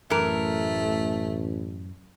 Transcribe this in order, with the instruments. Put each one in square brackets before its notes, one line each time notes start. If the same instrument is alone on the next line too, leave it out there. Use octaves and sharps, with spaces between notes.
[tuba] A1 [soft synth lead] F#2 [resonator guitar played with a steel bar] E3 A#4 [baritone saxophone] A3